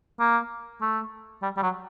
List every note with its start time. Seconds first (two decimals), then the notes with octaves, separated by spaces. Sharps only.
0.20 A#3
0.82 A3
1.42 G3
1.57 G3
1.63 F#3